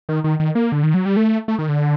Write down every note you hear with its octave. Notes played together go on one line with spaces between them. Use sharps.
D#3
D#3
D#3
A#3
D3
D#3
F#3
G3
A3
A3
D#3
D3